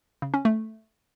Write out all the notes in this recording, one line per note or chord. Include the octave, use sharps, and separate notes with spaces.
C#3
C#4
A3